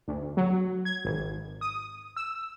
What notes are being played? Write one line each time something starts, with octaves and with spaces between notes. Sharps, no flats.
D2
F#3
G#6
G#1
D#6
E6